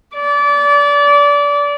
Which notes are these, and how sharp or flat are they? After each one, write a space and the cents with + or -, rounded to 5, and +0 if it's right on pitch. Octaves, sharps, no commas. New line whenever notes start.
D5 -25